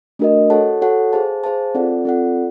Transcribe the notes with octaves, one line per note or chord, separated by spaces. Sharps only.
A3 D4 F#4 A#4 D#5
F#4 A4 C#5 F#5 A5
F#4 A4 C#5 F#5 A5
G#4 C5 F5 A5
G#4 C5 F5 A5
C4 F4 A4 D5 F#5
C4 F4 A4 D5 F#5